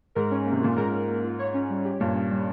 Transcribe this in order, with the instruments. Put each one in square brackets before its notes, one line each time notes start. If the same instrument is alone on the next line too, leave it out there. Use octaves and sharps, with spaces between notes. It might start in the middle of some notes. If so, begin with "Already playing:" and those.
[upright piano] G#2 [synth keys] A#4
[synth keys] C#4
A#3
[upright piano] C3
[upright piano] A#2 [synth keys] F4
[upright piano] G#2 [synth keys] A#4
[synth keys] C#4
A#3
F4
C#5
C#4
G3
G4
[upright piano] G2 A#2 [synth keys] C#5
[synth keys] C#4
G3